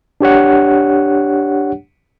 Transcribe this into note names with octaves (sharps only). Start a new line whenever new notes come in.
D4 G4 C#5 F#5